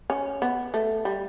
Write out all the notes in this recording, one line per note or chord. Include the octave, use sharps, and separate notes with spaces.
C#4
B3
A3
G3